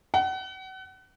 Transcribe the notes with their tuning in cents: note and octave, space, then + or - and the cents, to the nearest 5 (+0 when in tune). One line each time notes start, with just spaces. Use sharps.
F#5 +35